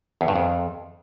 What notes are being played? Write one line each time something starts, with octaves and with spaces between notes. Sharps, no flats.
E2
G2
F2